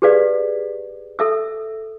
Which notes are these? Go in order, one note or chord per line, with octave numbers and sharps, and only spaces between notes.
G4 G#4 B4 D5 F5
A4 E5 E6